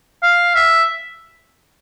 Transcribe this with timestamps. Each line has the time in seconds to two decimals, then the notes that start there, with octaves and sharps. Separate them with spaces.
0.23 F5
0.55 E5